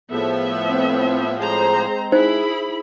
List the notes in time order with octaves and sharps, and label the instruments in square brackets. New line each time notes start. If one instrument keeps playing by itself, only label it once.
[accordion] A2 F3 [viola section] B3 E5 [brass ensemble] G#4 A4
[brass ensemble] C4
[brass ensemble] G#3 C4 [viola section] G#4 C5 A#5
[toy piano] D#4 C5 [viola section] E4 G#4 B5